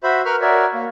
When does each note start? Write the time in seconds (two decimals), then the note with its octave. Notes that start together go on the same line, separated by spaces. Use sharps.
0.03 F#4 C5 E5 B5
0.25 A#4 B4 B5 C#6 F6
0.41 F#4 A#4 C#5 D5 E5
0.74 A#3